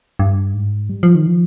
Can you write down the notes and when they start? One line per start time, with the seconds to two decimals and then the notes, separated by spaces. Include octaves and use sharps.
0.19 G2
0.54 G#2
0.90 G3
1.03 F3
1.15 D#3
1.27 F3